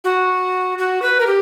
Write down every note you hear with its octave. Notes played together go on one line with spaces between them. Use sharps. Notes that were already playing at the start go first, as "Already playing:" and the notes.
F#4
F#4
B4
A#4
G4